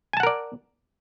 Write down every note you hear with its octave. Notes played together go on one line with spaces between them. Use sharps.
A#4 D5 F#5 G#5 A5